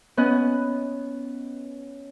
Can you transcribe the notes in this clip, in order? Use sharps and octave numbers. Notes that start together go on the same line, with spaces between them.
B3 C#4 D#5 F#6